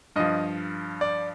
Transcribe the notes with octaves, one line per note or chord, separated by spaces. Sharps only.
G2 F3 D#5
D5